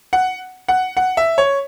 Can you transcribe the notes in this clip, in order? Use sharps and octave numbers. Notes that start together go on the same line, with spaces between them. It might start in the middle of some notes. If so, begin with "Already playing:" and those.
F#5
F#5
F#5
E5
C#5